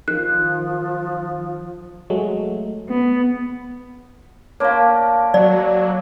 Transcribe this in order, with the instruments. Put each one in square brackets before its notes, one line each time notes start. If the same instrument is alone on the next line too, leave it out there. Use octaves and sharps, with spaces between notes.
[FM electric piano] D#3 [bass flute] F3 [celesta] F#6
[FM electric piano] F#3 G#3 A3
[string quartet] B3
[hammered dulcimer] D3 A#3 [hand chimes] C#5 F5
[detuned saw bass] F#3 [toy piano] D5